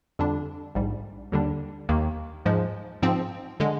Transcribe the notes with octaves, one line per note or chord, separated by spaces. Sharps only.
F2 D3 G3 D4
A#1 G#2 G3
D#2 D3 G3 D4
D#2 D#3 A#3
G#2 F3 G#3
G#2 F3 C4
D3 G#3